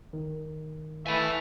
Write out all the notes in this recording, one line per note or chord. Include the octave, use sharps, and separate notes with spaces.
D#3
E3 A3 G#5 B5